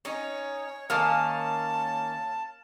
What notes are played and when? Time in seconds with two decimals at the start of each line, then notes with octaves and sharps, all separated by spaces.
0.05 C#4 D#4 C#5
0.90 D#3 A#3 C#4 F5 A5